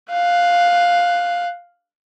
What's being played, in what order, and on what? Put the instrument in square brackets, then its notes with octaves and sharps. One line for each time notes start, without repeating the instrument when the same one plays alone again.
[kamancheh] F5 F#6